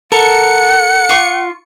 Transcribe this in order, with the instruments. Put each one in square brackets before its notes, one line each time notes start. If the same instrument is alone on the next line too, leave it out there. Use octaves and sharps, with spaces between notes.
[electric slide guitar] A4 [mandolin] A#4 [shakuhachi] F#5 [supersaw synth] C#7
[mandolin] F4 C#6